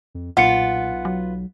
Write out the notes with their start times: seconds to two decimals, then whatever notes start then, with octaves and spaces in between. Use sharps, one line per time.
0.15 F2
0.37 B1 A#2 B3 F4 F#5 C#7
1.05 F#3